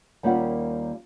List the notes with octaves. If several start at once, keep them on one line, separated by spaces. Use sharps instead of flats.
D#2 G3 A#3 C#4 F4 F#5